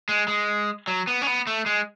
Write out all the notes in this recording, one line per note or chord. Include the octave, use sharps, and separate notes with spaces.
G#3
G#3
F#3
B3
C#4
B3
A3
G#3